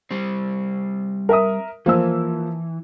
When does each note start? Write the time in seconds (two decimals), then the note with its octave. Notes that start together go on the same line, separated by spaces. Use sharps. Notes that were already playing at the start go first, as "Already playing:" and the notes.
0.11 G3 C4
1.29 A#4 E5 D#6
1.86 E3 F3 A#3 E6